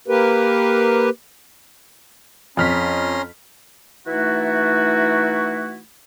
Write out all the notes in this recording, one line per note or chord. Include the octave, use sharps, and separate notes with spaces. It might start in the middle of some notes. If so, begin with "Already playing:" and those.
A#3 G4 A#4 B4
F2 C#4 A#5 C6 F6 B6
E3 A3 D#4 E4 F#4